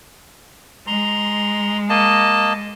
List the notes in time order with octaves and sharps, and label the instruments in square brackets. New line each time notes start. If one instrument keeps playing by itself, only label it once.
[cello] G#3 [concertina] A#5 C6
[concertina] A#3 D#5 A5